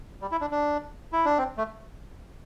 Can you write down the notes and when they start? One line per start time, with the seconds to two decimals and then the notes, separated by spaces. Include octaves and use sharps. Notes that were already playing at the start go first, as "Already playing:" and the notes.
0.22 G3
0.32 E4
0.41 D4
0.51 D4
1.13 E4
1.25 D4
1.38 C4
1.57 A3